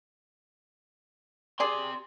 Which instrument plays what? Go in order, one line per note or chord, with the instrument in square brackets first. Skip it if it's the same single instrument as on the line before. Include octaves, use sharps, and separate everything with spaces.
[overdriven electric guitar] G4 C6 [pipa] G#4 D5